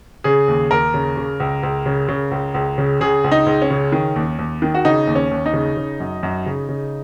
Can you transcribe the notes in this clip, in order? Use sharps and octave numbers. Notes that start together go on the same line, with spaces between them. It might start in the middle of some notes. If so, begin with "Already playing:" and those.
C#3 G#4
D#2
D#2 A#4
C#3
C#3
C#2
C#2
C#3
C#3
C#2
C#2
C#3
C#3 G#4
C#2
D#4
C#2
C#4
C#3
D#3
D#2
D#2
D#3
F#4
C#3 D#4
D#2
C#4
D#2
D#4
C#3
C#3
F#2
F#2
C#3
C#3